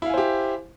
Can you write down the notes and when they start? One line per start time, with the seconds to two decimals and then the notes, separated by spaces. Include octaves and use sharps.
0.02 E4
0.06 F5
0.10 G#5
0.14 C5
0.18 G4